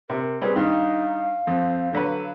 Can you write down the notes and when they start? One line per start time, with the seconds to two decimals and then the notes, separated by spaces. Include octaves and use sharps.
0.10 C3 A#4
0.41 G3 C4 G#4 B4
0.56 G2 D#3 D#4 F5
1.47 F2 C4
1.93 D3 F#3 A4 B4